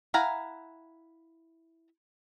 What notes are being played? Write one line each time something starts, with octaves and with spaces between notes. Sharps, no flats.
E4 F5 F#5 G#5 A#5